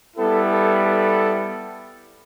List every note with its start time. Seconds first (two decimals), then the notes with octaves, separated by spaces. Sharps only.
0.16 G3 B3 E4 A4
0.50 A4
0.84 A4